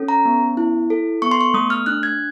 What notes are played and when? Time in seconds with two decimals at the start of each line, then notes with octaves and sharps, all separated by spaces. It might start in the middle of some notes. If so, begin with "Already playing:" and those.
Already playing: C#4 A4
0.09 A#5
0.25 B3
0.57 E4
0.90 A4
1.22 B3 C#6
1.31 C6
1.41 C#6
1.54 A3 D#6
1.70 F6
1.86 D4 F#6
2.03 G#6